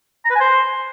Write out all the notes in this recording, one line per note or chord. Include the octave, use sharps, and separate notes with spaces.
A#5
B4
G#5
C5